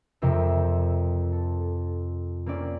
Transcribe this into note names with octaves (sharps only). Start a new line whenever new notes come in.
F2 C3 A#4 C5 E5
A4
A#3 C4 C#4 D5